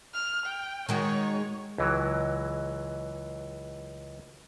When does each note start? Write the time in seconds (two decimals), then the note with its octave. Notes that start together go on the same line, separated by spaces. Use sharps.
0.14 F6
0.46 G5
0.89 D#3 G#3 F#4 C#5
1.78 C#2 E3 F#3